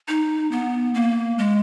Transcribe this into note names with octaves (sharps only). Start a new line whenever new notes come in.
D#4
B3
A#3
G#3